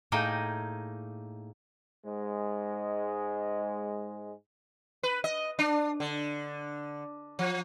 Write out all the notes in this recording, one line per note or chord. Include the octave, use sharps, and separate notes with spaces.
A2 A#3 D#4 G#4 D#5 G5
G#2 G#3
B4
D#5
D4
D3
F3